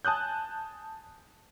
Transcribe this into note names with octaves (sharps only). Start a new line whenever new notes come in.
G#5 A5 D#6 F#6 G6